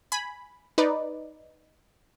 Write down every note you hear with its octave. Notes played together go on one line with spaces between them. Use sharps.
G#5 B5
D#4 B4 D5